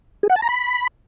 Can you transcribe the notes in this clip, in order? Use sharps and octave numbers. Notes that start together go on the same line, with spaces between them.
G#4
F#5
A5
A#5
B5